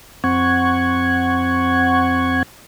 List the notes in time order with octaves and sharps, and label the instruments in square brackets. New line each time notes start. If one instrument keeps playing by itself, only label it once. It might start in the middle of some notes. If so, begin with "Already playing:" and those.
[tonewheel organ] F2 C4 F#5 C#6 G#6